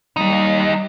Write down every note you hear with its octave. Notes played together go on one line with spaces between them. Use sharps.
D#2 G3 D#4